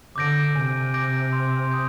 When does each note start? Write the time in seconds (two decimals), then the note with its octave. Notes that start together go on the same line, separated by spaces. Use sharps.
0.16 D3 D6 G6 A#6 D7
0.55 C3 G#5
0.94 D6 G6 A#6 D7
1.33 C6
1.71 D#6 G6